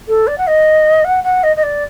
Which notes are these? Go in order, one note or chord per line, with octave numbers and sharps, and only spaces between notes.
A4
D5
F#5
D#5
F#5
F#5
D#5
D#5
D5